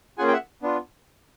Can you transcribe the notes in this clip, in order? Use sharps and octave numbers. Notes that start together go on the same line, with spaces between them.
A#3 C#4 F4 G#4 F#5 G#5
G5
E5 F#5
B3 D4 F4